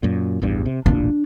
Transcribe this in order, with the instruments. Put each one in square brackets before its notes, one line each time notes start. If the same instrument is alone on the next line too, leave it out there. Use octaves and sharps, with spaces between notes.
[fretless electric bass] F#2 A#2
A1 E2 G2
C3
[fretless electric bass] E1 A1 A#2 [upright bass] D4